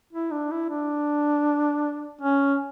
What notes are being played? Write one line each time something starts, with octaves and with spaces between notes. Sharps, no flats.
E4
D4
E4
D4
C#4